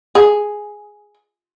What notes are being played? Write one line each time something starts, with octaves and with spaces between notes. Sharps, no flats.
G#4